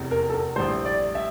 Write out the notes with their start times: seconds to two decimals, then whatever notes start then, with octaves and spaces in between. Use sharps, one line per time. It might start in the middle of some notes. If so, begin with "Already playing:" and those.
Already playing: F1 E2 C3
0.11 A#4
0.30 A4
0.34 A#4
0.56 A#1 A2 G3 C5
0.85 D5
1.15 E5